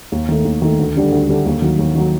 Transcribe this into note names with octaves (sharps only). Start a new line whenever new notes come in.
D#2
D#3 A3
D#2
D#3 A3
D2
D3 G3 D4 A4
D2
D3 G3 D4 A4
D#2
D#3 F#3
D#2
D#3 F#3